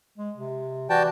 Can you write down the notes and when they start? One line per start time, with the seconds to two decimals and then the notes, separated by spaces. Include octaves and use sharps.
0.18 G#3
0.38 C3
0.90 E3 F#4 D5 G5 A5